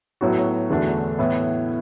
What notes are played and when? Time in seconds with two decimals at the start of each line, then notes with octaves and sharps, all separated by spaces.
0.21 A2 F#3 B3 F#4
0.70 E2 D3 A3 D4 F#4
1.19 A2 E3 B3 E4